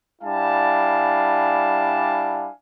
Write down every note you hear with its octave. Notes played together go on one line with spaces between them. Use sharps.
G3 D4 E4 F5 G#5 A5